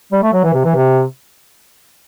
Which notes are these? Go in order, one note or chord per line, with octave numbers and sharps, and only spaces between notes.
G3
A3
F#3
E3
C3
E3
C3